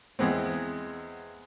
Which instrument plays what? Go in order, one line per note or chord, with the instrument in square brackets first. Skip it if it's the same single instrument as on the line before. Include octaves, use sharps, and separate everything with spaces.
[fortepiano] E2 G#3 B3 C4